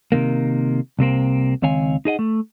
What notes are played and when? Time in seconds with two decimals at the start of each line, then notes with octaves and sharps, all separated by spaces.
0.12 C3 D#3 A#3
0.99 C2 C3 A#3 C4
1.62 C#2 D#3 C4 C#5 F5 G#5
2.05 D#4 G#4 D#5 F#5
2.19 A3